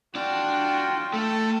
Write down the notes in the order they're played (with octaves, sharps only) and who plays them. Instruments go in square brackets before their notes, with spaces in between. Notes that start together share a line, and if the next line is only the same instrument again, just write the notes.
[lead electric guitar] D4 D5 [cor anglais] F4 [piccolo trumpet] F#4 [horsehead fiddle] G5
[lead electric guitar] A3 [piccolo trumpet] A4